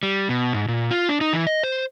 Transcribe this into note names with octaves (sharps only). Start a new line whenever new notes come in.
G3
B2
G#2
A#2
F4
D4
D#4
E3
D#5
C5